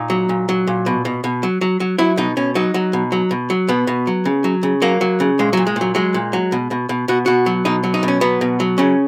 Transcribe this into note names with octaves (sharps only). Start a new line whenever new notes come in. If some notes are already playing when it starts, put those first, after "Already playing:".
Already playing: A#2 D#4
F#3
A#2
F#3
A#2
B2
B2
B2
F#3
F#3
F#3
F#3 E4
B2 D#4
B2 C#4
F#3 D#4
F#3
B2
F#3
B2
F#3
B2 B3
B2
F#3
C#3
F#3
C#3
F#3 A#3
F#3
C#3
A#2 G#3
A#2 F#3
G#3
A#2 F#3
F#3 G#3
A#2
F#3
B2
B2
B2
B2 F#4
B2 F#4
F#3
B2 D#4
F#3
D#4
B2
C#4
F#3 B3
B2
F#3
C#3 C#4